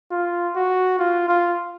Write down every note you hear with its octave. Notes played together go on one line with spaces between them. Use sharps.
F4
F#4
F4
F4